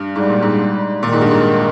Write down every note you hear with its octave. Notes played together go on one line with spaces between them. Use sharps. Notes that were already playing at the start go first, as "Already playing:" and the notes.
Already playing: G2
G#2 G3
A#2
G#2
A#2 D#3
G#2
G2
G#2